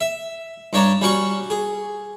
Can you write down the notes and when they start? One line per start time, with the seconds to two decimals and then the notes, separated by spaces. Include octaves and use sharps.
0.01 E5
0.73 G2 D4 C#5 A5 A#5
1.01 G3 C#4 F#4 C#6
1.50 G#4